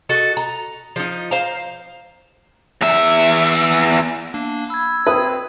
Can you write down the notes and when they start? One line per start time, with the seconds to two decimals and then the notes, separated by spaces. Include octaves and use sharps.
0.09 F#4 A4 D#5
0.37 A#5
0.96 F3 D#4
1.31 C5 F5 A#5
2.81 E2 E5
4.34 A#3 D4
4.70 B5 E6 G#6
5.07 C4 B4 D#6